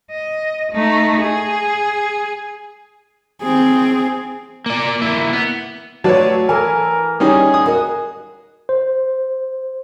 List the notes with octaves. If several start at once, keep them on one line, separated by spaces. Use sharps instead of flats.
D#5
A3 D#4
G#4
C4 G#4
A#3 D5
A#3 E4
B3
F#3 A3 B4 C#5 D5 A5
E3 A4 A#4 G#5
G3 C#4 D#4 G#4
D#6
F#4 A#4 D#5
C5